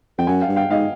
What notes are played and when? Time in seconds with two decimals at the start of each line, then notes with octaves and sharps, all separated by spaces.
0.18 F2 G5
0.27 F#2 F#5 G#5
0.41 F5 G5
0.49 G2
0.56 F5 G5
0.70 G#2 D#5 F5